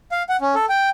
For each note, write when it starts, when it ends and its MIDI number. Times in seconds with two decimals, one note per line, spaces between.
0.12 0.23 77
0.29 0.37 78
0.41 0.55 61
0.55 0.66 69
0.69 0.89 79